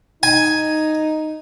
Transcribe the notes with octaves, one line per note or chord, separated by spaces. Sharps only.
D#4 G#5